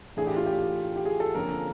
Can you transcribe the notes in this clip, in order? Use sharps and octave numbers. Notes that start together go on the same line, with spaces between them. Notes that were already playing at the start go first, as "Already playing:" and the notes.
A2 E3 A3 D4 G#4
G4
F4
G4
G4
G#4
A4
F2 D3 F3 A#3 C#4 A#4